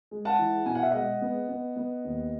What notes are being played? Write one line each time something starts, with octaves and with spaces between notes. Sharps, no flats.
G#3
F#5 A5
E3
B2 G#5
F#5
E5
G#3 D#5 F#5
B3
B3
B3
D#2